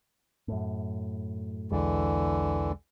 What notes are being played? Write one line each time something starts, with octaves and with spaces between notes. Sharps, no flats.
F#2 A2
B1 E2 D3 E3 G#3